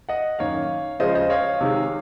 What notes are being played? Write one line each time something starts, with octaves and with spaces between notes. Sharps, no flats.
D#5 F#5
F#2 D#3 A#3 C#5 F5
C#3 F3 G#3 C#4 F4 C5 D#5
C5 D#5
C#5 F5
C3 D#3 G#3